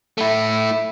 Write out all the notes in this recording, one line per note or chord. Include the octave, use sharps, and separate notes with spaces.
A3 E4